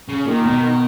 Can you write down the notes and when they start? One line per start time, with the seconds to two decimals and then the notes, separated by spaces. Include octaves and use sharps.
0.08 C#3
0.27 A#2 D#3
0.46 B2